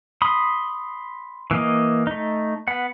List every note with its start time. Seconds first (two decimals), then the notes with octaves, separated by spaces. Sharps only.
0.22 B5 C6 D#6
1.51 E3 A#3 D#5
2.07 A3 D#4
2.68 B3 F#5